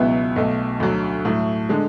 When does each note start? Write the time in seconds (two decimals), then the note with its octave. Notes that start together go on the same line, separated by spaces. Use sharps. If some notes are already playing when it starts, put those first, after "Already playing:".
Already playing: C#2 B2 F#3 B3 E4
0.36 B1 B2 A3
0.80 D2 D3 F#3
1.25 A2 F#3 A3
1.69 D3 G#3